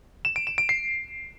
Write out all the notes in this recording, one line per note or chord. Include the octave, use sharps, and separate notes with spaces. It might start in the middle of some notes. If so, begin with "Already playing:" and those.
E7
D7
E7
D7
C7